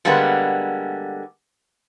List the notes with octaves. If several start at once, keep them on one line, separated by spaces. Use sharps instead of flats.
D3 G3 G#3 A#3 B3